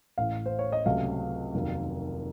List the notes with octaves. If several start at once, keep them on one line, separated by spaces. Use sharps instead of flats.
A1 A2 A3 F5
C5
C#5
D#5
C#2 C3 F#3 A3 F5
F1 D#2 D#3 F#3